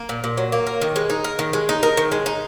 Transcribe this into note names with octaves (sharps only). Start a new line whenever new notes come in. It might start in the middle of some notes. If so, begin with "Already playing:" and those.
Already playing: A#3
A#2
A#2
F#3
A#3
A#4
D#3
G#3
D#4
A#4
D#3
G#3
D#4
A#4
D#3
G#3
D#4